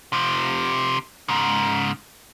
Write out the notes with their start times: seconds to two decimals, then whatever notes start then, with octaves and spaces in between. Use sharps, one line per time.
0.13 C3 F3
1.29 G#2 C#3